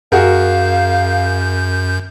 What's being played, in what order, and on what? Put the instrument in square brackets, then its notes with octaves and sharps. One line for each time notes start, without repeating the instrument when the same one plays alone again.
[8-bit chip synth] F#2 G6 [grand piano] F#4 G#4 A#4 [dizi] F5